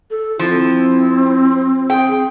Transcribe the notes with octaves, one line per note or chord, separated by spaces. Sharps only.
A4
F3 C4 E4
G#4 G5